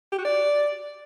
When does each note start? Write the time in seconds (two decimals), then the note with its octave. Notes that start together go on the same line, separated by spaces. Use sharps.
0.12 G4
0.19 F#4
0.25 D5